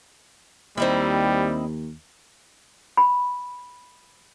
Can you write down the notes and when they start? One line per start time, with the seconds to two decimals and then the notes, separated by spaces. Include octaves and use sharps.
0.77 D#2 G3 C4 D#4 E4
2.97 B5